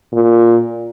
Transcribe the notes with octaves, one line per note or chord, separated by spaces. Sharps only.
A#2